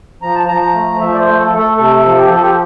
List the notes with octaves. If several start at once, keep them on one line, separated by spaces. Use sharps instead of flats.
F3 A#5
A5
F3 A#5
A#5
A3
F3 E5
D5
C5
A3
A4
A3
A4
C3 A4
F3
G4
F3 A4
G4